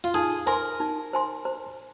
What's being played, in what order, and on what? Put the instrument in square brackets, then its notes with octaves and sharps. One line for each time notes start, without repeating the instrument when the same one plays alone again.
[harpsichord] F4
[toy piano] D#4 [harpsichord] G#4
[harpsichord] A#4 [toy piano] C5 G#5 C6
[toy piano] D#4
C5 G#5 C6
C5